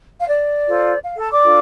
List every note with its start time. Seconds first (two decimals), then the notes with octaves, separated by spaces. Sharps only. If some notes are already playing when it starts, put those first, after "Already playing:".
0.20 F5
0.28 D5
0.67 F4 A4 C5
1.05 F5
1.17 A4 A5
1.30 D5 D6
1.43 D4 F4 A4